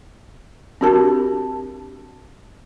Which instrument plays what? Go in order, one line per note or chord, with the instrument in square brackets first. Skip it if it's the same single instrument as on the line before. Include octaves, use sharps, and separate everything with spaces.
[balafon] C4 D4 F#4 G4 A#4 A5